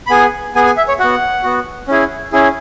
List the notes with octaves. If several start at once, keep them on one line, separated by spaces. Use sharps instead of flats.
B5
B3 G#4 G#5
B3 G#4 G#5
G#5
E5
C#5
B3 F#4 F#5
B3 F#4
C#4 E4 G#4
C#4 E4 G#4